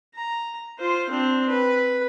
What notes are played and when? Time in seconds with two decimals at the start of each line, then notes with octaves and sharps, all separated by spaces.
0.15 A#5
0.78 F4 C5
1.09 C4 D4
1.49 B4